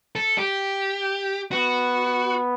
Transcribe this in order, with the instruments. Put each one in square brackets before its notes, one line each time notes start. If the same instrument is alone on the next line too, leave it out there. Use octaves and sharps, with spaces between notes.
[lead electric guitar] A4
G4
[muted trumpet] B3 [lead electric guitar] F#4